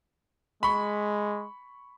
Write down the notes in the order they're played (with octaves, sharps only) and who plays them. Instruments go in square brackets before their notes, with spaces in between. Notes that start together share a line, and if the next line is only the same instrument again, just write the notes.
[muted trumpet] G#3 [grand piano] B5 C#6